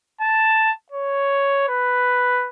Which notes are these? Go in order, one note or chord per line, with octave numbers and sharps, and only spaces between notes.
A5
C#5
B4